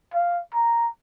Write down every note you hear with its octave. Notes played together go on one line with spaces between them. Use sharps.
F5
A#5